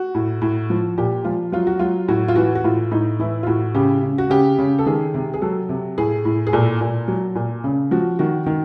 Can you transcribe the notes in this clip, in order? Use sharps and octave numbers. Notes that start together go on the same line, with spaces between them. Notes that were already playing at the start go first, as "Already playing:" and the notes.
Already playing: F#4
A2
A2
F3
A#2 G4
F3 F4
F#3 F4
F#4
F#3 F4
A2 F#4
F4
E3 F#4
F#4
A2 F4
A2 D#4
E3 E4
F4
A2 F#4
C#3 G4
C#3
F#4
C#3 G4
C#3
A4
D#3 G#4
C3
G#4
F#3 A4
C3
A2 G#4
A2
G#4
A#2 A4
A#2
F#3
A#2
C#3
F3 F#4
D#3 F#4
D#3